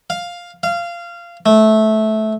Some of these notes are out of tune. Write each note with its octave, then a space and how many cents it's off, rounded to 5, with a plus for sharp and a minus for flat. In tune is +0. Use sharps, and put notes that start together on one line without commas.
F5 +5
F5 -20
A3 -15